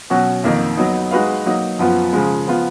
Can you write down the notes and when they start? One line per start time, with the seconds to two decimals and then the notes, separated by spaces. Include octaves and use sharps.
0.10 B2 F#3 C#4 F#4
0.44 F2 D#3 A#3
0.77 F#3 B3 D#4
1.11 G#3 D#4 F#4 B4 F5
1.46 F#3 A#3 D#4
1.79 F#2 F3 B3 F4
2.13 C#3 F3 G#3
2.47 F3 B3 F4